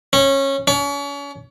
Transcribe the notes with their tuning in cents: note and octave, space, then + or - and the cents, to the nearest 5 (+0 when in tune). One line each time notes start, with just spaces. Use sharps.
C#4 -20
C#4 +35